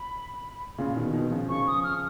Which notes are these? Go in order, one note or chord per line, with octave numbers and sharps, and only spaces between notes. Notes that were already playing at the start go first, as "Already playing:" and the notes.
Already playing: B5
A#2 C#3
B2 D#3
B2 D#3
C#3 F3
C#3 F3 C#6
D#6
F6